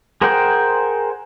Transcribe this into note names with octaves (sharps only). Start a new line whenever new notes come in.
G#4 A#4 C5 F#5 G5